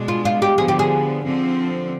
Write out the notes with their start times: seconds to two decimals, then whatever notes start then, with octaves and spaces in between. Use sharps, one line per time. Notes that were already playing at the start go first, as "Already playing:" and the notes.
Already playing: B2 G#3 D4
0.08 F4
0.25 F4
0.42 G4
0.58 D3 F3 B3 G#4
0.68 G4
0.79 G#4
1.25 D3 F3 C4